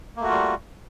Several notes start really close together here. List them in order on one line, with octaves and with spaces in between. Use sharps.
A#3 A3 F#4 F4 G3